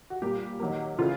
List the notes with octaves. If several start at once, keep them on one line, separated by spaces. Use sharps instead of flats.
F#4
A#2 G3 A#3 G4
D#3 F#3 A#3
C#3 E3 A3 F4